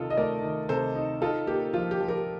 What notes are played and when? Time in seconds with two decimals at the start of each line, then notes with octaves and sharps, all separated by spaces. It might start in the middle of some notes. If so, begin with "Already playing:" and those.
Already playing: C3 D#3 D#4 F4 A4
0.10 D#5
0.17 A3 A#4 D5
0.43 D#3
0.69 C3 A4 C5
0.95 D#4
1.22 D#4 F4 A4
1.47 A#3 G4
1.74 F3 F4
1.91 G4
2.00 F3
2.08 G4 A#4